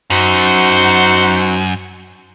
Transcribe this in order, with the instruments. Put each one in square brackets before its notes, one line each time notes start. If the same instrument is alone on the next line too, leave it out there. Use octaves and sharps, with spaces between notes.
[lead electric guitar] F#2 [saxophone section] D#4 F#4 C5